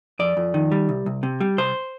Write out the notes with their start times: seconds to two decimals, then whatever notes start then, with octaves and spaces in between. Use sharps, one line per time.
0.19 F2 D5
0.37 F2
0.54 D#3
0.72 G3
0.89 C2
1.06 C2
1.23 C3
1.41 G3
1.58 C2 C5